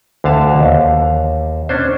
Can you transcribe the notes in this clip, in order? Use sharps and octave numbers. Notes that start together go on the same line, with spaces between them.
D2 D3 F5 A5
D#2
C#4 D4 C5